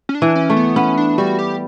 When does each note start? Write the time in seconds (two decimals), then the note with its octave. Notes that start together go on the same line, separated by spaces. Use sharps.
0.09 C#4
0.15 D4
0.22 E3
0.35 C#4
0.50 A3
0.56 B3
0.76 B3 C#4
0.97 D4
1.18 G3 F#4
1.39 G4